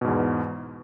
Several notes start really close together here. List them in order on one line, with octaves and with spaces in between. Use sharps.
B2 G#2 E2